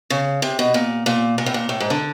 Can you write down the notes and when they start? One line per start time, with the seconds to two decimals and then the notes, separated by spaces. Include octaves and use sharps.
0.10 C#3
0.42 C3
0.59 B2
0.74 A#2
1.06 A#2
1.38 A#2
1.46 A2
1.54 A#2
1.69 A2
1.80 G#2
1.90 D3